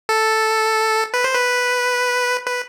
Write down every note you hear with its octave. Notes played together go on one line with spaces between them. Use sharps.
A4
B4
C5
B4
B4